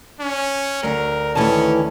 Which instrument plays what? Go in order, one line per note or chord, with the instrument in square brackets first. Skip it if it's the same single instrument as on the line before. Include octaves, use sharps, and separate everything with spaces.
[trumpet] C#4
[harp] D2 [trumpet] A#4
[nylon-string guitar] D#3 E3 A3 [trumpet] C#4 [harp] A5